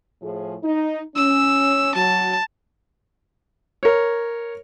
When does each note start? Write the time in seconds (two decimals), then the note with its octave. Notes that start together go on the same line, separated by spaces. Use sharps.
0.22 A2 F3 G#4
0.63 D#4
1.16 C#4 E6
1.95 F#3 A5
3.83 A#4 C#5